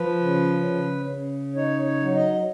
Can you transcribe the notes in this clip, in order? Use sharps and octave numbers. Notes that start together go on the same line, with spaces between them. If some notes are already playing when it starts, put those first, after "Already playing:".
Already playing: F3 B4
C#3
C#3
C#3
D#4 C#5
C#5
F#3
D#5